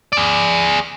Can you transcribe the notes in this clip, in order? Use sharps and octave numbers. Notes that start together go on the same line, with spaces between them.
G#4 D5